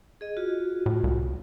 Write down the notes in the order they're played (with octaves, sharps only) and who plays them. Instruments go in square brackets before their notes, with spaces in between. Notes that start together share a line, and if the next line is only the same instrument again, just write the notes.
[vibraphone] G#4 D#5
F4 F#4
[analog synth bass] A2
C2